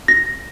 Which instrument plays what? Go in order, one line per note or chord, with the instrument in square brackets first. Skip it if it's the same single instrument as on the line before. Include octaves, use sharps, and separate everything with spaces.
[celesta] A#6